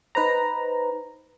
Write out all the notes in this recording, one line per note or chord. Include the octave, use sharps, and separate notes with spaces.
D#4 B4 C5 A#5